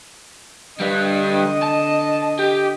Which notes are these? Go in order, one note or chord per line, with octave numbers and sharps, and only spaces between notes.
D3 G3 B4 D#5
A5
G4